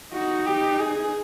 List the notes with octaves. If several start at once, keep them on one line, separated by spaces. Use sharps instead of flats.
D#4 F#4
G4
G#4